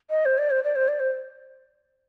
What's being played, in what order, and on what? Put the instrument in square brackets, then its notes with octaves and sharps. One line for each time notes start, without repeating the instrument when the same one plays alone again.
[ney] D#5
C5
D5
C5
D5
C5
D5
C5